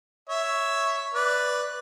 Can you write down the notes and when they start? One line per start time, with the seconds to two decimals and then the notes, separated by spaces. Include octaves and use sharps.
0.29 C#5 E5
1.14 B4 D5